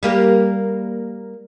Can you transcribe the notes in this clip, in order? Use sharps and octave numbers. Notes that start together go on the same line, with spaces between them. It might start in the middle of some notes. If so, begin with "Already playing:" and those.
G3 A#3 G4